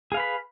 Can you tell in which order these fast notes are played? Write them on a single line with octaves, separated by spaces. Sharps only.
G#4 F5 B4 B5